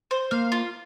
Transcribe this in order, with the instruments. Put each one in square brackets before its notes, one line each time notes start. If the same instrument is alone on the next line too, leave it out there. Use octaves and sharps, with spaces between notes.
[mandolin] C5
[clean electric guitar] A#3 [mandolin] F5
[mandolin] F4